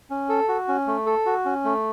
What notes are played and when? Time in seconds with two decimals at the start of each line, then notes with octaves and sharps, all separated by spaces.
0.10 C#4
0.29 A4
0.49 F#4
0.68 C#4
0.86 A3
1.06 A4
1.26 F#4
1.45 C#4
1.64 A3